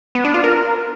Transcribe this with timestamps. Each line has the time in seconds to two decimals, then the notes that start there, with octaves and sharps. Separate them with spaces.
0.15 B3
0.25 D4
0.34 F4
0.44 A#4